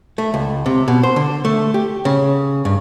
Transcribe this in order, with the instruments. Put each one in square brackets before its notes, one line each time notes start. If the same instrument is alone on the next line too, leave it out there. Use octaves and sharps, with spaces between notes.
[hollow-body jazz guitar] A3
C#2
C3
B2
C5
D3
A3
G4
C#3
G2